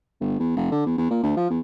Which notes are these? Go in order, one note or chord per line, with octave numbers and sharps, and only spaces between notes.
G1
E2
F1
D3
E2
E2
A#2
D2
F3
E2